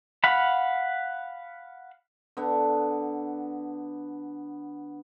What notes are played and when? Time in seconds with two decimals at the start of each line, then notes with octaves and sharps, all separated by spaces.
0.24 F5 F#5 B5
2.37 D3 B3